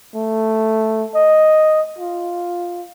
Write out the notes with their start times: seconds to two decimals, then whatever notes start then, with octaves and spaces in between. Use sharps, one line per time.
0.15 A3
1.15 D#5
1.99 F4